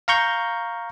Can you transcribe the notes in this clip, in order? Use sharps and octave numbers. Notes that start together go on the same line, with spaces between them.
F5 A#5 C#6 G6